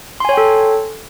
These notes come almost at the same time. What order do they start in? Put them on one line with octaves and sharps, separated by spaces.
C6 G#5 C#5 G5 A4